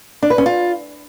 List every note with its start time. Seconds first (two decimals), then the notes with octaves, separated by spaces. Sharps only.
0.23 D4
0.30 B4
0.38 C#4
0.46 F4